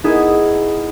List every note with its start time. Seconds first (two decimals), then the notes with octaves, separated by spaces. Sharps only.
0.04 B3 D#4 E4 G#4